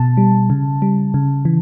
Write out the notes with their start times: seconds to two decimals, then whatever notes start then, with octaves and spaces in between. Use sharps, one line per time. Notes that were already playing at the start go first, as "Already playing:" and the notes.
Already playing: B2 A5
0.17 G3
0.50 C#3
0.82 G3
1.14 C#3
1.45 E3